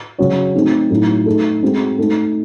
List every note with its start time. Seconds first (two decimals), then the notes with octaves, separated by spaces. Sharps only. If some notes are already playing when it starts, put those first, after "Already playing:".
0.18 C#3 F#3 C#4 F#4 C#5
0.55 A3 C4 D#4
0.90 A2 F#3 A3 D#4
1.26 A3 D#4 A4
1.62 G#3 C4 F#4
1.99 A3 D#4 A4